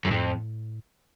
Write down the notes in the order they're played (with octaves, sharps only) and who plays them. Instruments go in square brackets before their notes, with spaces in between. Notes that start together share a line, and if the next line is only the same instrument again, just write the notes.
[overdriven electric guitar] F#2
[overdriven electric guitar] F2 [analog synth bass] A2